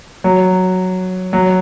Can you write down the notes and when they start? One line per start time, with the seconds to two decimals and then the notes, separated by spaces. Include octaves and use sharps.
0.24 F#3
1.33 F#3